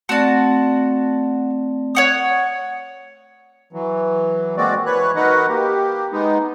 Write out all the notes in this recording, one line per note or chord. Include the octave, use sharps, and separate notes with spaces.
A3 C4 F#4 D5 A5
C#5 F#5 D#6
E3 F#3
G#3 A#3 C4 F#4 D5
E3 B4 C#5 F#6
D#4 F#4 A#4 B4 D#5 F#5
A#3 G4
G#3 B3 D#4